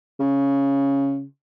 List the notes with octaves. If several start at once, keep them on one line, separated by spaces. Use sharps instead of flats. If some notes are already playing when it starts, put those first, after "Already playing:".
C#3